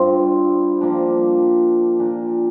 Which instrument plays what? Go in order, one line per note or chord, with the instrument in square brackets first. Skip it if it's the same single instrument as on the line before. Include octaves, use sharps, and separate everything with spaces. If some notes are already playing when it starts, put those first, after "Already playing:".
Already playing: [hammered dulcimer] G2 G3 C4 F4
F3 A#3 D4
A#2 A#3 D4